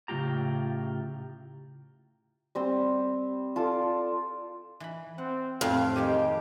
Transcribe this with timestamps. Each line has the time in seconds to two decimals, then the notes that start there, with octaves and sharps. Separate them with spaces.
0.08 A2 C#3 G#3 F4 G4 A#5
2.55 G3 C4 C5
3.56 F4 A4 D5
4.80 E3 B5
5.18 C4 F#5
5.61 F2 A2 F5
5.96 D#3 G#3 G4 G#4